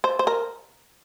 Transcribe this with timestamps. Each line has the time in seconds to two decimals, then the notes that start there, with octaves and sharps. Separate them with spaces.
0.04 C5
0.19 C5
0.27 A#4